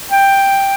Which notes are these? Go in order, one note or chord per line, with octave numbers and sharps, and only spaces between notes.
G5